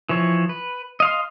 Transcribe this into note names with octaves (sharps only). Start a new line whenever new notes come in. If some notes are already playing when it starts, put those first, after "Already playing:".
E3 F3 C#5
B4
D#5 F5 C6